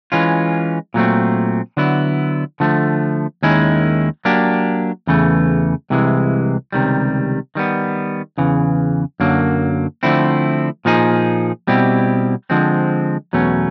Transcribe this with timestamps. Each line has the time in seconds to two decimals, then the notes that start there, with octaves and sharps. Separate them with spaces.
0.12 E3 G#3 C#4 F4
0.94 A#2 F#3 A3 C4
1.77 D3 F#3 B3 E4
2.60 D3 F3 A3
3.43 D#2 D#3 G#3 C#4 E4
4.25 F#3 A#3 D4 G4
5.07 E2 C#3 E3 A3
5.90 C2 C3 E3 G#3
6.72 C#2 C3 D#3 G3
7.55 D#3 G3 B3
8.38 E2 C#3 E3
9.20 F#2 D3 F#3 A#3
10.03 D3 F3 A3 C4 E4
10.85 A#2 F3 A#3 D#4 G#4
11.67 B2 G3 C4 E4 G4
12.50 D3 F3 G#3 C4
13.33 E2 B2 F#3 A3 C#4